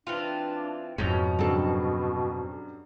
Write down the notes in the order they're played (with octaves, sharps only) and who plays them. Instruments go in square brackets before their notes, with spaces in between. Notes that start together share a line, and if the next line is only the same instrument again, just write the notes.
[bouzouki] E3 C4 F4 [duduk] D4
[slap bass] F2 G#2 [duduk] B2 [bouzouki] C#4 A#5
[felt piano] G2 C#3 F#3 [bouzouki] C4 A4